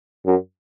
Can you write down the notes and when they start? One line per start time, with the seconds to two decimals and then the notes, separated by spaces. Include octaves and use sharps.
0.26 F#2